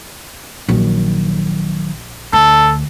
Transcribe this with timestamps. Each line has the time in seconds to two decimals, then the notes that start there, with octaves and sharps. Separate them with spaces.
0.69 A#1 D#3 F#3
2.33 D2 A4